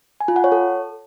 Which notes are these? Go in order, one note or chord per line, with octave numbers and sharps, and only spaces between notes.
G#5
F4
F#5
C#5
A4